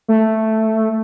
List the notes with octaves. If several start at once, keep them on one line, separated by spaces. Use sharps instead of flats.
A3